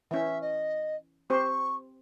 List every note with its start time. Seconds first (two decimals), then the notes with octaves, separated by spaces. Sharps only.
0.11 E3 C#4 E5
0.41 D#5
1.30 C4 G4 C5 C#6